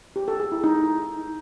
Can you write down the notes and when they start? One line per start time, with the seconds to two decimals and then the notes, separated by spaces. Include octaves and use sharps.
0.16 G4
0.28 A4
0.40 G#4
0.52 E4
0.64 D#4